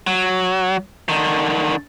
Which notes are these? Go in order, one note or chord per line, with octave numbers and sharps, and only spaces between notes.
F#3
D3 D#3